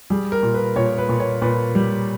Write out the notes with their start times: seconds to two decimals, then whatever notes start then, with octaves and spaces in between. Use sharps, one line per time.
0.10 G3 G#4
0.32 A#4
0.43 A#2
0.54 B4
0.76 A#2 C#5
0.98 B4
1.09 A#2
1.20 C#5
1.42 A#2 B4
1.75 G3